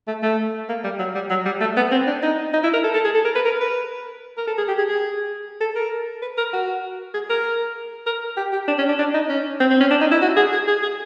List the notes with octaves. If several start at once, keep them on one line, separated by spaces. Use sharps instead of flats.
A3
A3
A#3
G3
F#3
G3
F#3
G3
A3
B3
C4
D4
D#4
D#4
E4
A#4
A4
A4
G#4
A4
A#4
B4
A#4
B4
A#4
A4
G#4
G4
G#4
G#4
A4
A#4
B4
A#4
F#4
G#4
A#4
A#4
G4
G4
D4
C#4
D4
D4
D#4
C#4
C4
C4
C#4
D4
D#4
E4
F#4
G#4
G#4
G#4
G#4